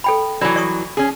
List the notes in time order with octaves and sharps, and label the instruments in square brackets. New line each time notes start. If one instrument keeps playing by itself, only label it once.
[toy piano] A4 G5 B5
[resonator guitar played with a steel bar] E3 F#3 [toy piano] D5 B5
[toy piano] D5 C#6 D#6
[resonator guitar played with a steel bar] C#4 G#4